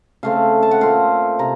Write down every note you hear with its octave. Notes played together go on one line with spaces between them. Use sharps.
C#3 A3 C4 F5
A5
F#5
A#2 A3 C4 F5
C3 A#5